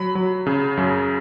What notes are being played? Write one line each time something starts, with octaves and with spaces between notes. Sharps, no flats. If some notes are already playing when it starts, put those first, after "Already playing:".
Already playing: F#3 B5
F#3
C#3
F#2